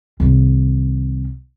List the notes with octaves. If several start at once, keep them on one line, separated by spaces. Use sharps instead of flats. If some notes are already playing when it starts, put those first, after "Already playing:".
C2 D#3